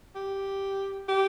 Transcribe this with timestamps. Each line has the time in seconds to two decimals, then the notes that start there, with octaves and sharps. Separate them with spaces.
0.15 G4
1.08 G4